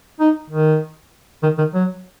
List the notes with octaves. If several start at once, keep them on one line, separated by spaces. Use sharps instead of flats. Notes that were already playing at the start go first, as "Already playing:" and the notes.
D#4
D#3
D#3
D#3
F#3